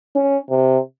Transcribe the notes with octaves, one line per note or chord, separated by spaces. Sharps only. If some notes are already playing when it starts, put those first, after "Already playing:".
C#4
C3